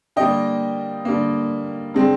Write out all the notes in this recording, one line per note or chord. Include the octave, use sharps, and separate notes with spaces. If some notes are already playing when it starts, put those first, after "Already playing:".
D3 G3 A#3 D#5 G5
D3 G3 A#3
D3 G#3 C4